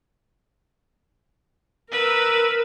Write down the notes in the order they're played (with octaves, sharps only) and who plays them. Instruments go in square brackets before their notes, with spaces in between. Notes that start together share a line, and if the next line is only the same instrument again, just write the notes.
[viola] A#4 [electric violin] B4 E6